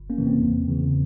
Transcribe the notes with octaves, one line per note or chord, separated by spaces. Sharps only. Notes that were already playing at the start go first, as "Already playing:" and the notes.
Already playing: G1
A#3 C#4
F2 C3 E3
C4
E2
C#3 E3